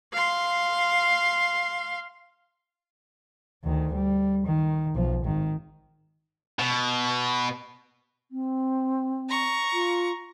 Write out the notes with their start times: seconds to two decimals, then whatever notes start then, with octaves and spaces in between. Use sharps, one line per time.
0.13 F5 C6
3.64 D2 D#3
3.93 G3
4.46 D#3
4.95 B1 F3
5.24 G#1 D#3
6.59 B2
8.31 C4
9.29 A#5 C#6
9.73 F4